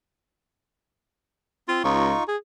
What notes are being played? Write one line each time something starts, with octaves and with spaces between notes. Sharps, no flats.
C4 F4
C#2 D#4 F4 C#6
G#4